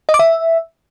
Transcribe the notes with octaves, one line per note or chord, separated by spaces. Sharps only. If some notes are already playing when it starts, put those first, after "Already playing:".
D#5
D6
E5